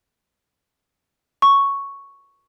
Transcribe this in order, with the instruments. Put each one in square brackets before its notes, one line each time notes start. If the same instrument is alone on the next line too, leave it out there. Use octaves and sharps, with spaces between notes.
[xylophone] C#6